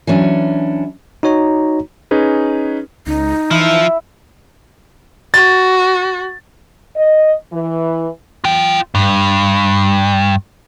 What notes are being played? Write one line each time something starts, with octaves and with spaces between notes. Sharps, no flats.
E3 F#3 C#4 D4
D#4 F#4 C#5 A#5
C#4 D#4 G#4 B4
C#2 D#4
E3 F3 E4
F#4 A6
D#5
E3
F4 G5
G2